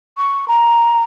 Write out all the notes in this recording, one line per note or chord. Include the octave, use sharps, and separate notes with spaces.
C#6
A#5